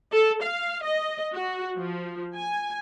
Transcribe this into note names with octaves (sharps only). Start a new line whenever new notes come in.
A4
F5
D#5
F#4
F3
G#5